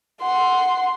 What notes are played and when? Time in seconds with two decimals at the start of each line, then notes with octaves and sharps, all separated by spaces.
0.22 F#5 C6